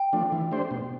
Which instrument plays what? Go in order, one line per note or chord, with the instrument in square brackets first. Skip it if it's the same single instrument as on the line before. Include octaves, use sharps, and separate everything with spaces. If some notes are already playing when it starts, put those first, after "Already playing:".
Already playing: [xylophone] G5
[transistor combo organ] F3 A3 D4
E3
A3 D4 G4 C5
B2